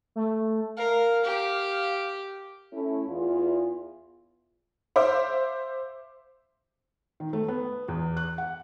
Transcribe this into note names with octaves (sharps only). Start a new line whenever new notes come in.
A3
A#4 F5
G4
A3 C#4 E4
E2 F4
C5 E5 F5 D6
D#3
A3
B3
E2
F#6
F#5